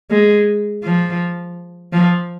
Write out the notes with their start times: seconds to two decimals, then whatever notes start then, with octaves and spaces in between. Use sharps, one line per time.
0.11 G#3
0.84 F3
1.93 F3